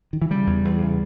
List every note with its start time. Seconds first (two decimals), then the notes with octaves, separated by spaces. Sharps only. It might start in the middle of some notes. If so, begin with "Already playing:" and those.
0.13 D#3
0.22 E3
0.30 C#3 G3
0.47 E2
0.65 E2
0.81 C#3